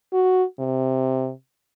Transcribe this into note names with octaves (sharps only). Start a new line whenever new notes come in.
F#4
C3